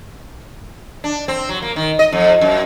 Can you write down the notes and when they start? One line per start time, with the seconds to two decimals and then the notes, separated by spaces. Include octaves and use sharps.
1.04 D4
1.28 C4
1.49 F#3
1.62 A#3
1.76 D#3
1.99 D#5
2.12 F2
2.41 F#2